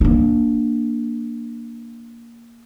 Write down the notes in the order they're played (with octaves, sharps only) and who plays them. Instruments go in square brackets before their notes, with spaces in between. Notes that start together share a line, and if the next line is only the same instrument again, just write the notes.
[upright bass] A#3 D4